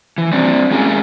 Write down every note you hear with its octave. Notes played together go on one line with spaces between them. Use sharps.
E3
G3 C4 D4
G#3 C#4 G#4 A#4